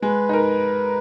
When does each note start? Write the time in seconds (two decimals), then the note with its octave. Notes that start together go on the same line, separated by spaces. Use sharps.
0.02 G#3 B4
0.29 D#4 A#4